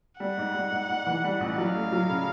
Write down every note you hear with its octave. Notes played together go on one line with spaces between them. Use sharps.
G3 F#5
G#2
G3
G#2
G#2
E3
G3
A1
F#3 F5
A3
F#3
C#3